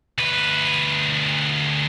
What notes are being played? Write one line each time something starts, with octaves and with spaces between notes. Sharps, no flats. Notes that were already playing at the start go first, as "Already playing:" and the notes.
D2 B4